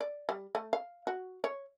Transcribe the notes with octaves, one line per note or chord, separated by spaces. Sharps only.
D5
G3
A3
F5
F#4
C#5